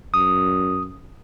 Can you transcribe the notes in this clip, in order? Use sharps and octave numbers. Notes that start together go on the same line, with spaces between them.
F#2 D#6